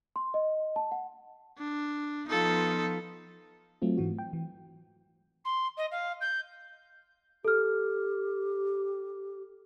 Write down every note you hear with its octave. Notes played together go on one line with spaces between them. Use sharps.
C6
D#5
A5
F#5
D4
F3 B3 D#4 F4 A4
F#3 A3 C4 F4
G#2 E3 F#4
G5
E3
C6
D#5
F5
G6
G4 A4 F6